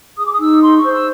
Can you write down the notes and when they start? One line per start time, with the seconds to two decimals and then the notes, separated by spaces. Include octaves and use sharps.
0.18 G#4 D#6
0.26 D6
0.33 D#6
0.40 D#4 E6
0.62 G#4 C6
0.77 C#6
0.84 C5
0.92 E6